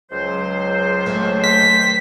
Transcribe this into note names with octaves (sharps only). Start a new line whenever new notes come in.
C#2 F#3 C5
A3 A#3 C4
B6
D#3